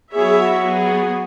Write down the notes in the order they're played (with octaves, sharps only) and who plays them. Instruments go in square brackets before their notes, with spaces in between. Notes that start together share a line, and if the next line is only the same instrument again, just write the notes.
[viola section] F#3 B3 E4 C#5 E5 [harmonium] G#4
[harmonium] G#4
F#4
[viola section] F#3 B3 G#4